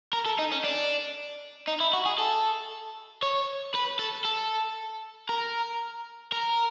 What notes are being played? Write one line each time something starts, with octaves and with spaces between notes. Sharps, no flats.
A#4
A4
D#4
C#4
D4
D#4
E4
F#4
G#4
A4
C#5
B4
A4
A4
A#4
A#4